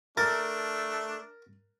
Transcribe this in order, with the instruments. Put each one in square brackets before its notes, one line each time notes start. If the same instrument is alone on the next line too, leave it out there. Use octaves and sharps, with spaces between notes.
[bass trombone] A3 [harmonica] D4 [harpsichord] A#4 [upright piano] A6